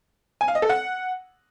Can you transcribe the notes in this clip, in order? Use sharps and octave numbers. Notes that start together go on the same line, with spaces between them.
G#5
F5
D#5
A4
F#5